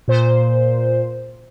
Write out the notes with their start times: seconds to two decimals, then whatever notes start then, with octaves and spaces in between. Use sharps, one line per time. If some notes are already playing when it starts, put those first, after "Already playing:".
0.08 A#2 C5